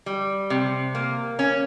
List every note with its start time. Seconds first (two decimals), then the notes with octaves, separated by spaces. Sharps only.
0.06 G3
0.50 C3
0.95 A#3
1.39 C#4